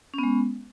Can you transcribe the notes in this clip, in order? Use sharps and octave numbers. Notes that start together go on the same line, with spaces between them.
G#3 B3 C#4